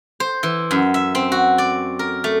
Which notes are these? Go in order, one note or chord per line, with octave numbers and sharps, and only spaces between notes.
C5
E3
F#2
E5
C4
F#4
D5
A#4
A3